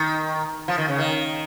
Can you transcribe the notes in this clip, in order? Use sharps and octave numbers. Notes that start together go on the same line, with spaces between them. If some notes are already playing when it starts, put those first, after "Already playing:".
Already playing: D#3
F3
D#3
C#3
D#3